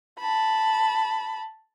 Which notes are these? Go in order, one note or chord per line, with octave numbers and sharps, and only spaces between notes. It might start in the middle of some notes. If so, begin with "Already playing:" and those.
A5 B5